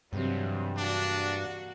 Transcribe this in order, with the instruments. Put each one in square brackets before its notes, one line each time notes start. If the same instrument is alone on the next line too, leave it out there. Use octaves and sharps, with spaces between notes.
[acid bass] G2 [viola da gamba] C3 E3 F#3
[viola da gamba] A#3 F#4 [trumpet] D4